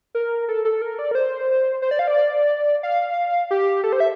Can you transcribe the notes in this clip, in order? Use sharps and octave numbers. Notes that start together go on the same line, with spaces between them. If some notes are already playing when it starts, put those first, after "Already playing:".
A#4
A4
A4
A#4
D5
A#4
C5
C5
D5
F5
D5
F5
G4
A4
C5
E5